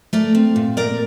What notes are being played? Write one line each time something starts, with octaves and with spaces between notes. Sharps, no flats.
A3 A#4 D5
C4
A#2
A#2 A#4 D5